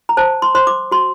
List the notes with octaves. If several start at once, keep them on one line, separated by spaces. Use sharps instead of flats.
A#5
C5 A5
C6
C5 C6
D6
F#4 C6